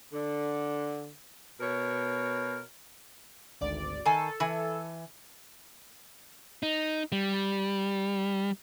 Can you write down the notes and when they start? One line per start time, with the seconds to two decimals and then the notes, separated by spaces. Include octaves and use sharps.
0.13 D3
1.61 B2 A#4 C#5
3.61 G#1 D2 D5
4.05 D#3 A4 G#5
4.40 E3 G#5
6.63 D#4
7.12 G3